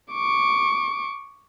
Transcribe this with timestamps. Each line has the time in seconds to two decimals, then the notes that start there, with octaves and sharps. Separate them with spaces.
0.12 C#6 D6